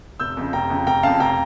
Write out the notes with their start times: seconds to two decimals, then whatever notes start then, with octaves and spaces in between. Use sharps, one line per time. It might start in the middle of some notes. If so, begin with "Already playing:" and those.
0.20 F1 E6 G6
0.37 F2 C#3
0.53 F1 G5 A#5
0.70 F2 C#3
0.87 F1 G5 A#5
1.03 F2 C#3 F5 A5
1.20 F1 G5 A#5